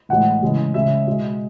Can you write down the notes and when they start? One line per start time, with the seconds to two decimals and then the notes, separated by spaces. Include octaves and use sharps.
0.09 A2 E3 G#3 F#5
0.42 C#3 E3 G#3
0.74 C#3 G#3 E5
1.07 B2 G#3